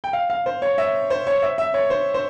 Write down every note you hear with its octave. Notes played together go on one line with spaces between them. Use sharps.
G5
F5
F5
C5
C#5
E5
C5
C#5
E5
E5
C#5
C5
C5